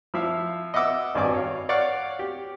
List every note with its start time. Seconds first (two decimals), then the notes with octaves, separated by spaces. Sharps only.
0.14 F3 E4 E5 F5
0.74 D#5 E5 F#5 D6 E6
1.15 G#1 G2 F#4 D5 G#5 D6
1.34 C#5 F5
1.69 C#5 D5 F5 F#5 C#6
2.19 G4